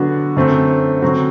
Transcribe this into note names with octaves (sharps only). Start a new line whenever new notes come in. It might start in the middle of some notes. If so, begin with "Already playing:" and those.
Already playing: D3 F#3 B3 D4 F#4
F#2 D3 A3 C4
D3 F#3 C4 F#4